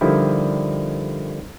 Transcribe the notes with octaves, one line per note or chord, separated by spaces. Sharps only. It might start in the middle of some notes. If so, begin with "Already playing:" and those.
D3 D#3 F3 G3 E4